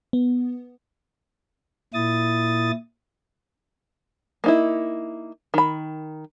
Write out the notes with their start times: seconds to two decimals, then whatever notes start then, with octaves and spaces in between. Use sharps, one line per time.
0.13 B3
1.94 A#2 E4 D#6 A6
4.44 A#3 D#4 E4
5.54 D#3 B5